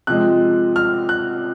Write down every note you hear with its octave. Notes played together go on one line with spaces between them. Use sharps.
C3 F3 G#3 F#6
F6
F#6